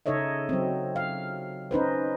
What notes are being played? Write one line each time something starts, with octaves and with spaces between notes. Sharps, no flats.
C#3 D#4 A4 C#5 D#5 E5
F#3 C4
F5
C#4 D#4 B4 C5